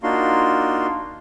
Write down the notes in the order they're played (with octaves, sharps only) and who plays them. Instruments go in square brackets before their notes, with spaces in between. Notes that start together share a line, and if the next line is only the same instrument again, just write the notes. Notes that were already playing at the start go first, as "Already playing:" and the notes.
[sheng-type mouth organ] A#3 D4 D#4 F4 F#4 C6